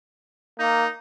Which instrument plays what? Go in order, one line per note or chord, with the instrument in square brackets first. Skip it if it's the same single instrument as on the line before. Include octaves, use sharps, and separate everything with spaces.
[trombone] A#3 [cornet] D#4